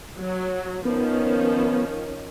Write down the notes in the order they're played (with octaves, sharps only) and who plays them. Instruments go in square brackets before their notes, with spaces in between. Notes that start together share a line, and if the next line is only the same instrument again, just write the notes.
[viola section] F#3
[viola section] D#3 F3 C#4 [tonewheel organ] B3